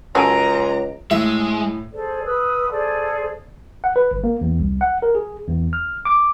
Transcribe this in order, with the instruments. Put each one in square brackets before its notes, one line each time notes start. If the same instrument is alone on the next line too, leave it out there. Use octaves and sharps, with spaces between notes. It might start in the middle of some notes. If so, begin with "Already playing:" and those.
[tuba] C#2 [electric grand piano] F#2 G#5 D7 [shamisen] C#4 F#4 A4 [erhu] A#5
[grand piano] A2 [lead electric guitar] G#3 [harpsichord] E5
[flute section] G#4 A4 C5 D5
B4 D#6 E6
G#4 A4 C5 D5
[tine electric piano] F#5
B4
G1
A#3
E2
C2
F#5
A#4
G#4
E2
F6
D6